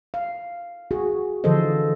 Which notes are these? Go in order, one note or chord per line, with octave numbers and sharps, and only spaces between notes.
F5
F#4 G#4
D3 E3 F3 A4 C5 D#5